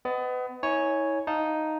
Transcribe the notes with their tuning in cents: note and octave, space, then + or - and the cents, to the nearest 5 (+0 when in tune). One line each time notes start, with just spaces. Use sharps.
B3 +30 D#5 -10
E4 -40 C#5 +0 G#5 +0
D#4 +0 F5 +0 A5 +0